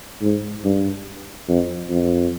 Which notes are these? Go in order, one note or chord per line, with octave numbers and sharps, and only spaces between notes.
G#2
G2
F2
F2